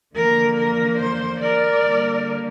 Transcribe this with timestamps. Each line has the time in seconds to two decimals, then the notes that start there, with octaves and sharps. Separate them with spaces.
0.14 D3 F3 A#3 A#4
0.56 A#4
0.98 C5
1.41 A#4 D5
1.83 D3 G3 A#3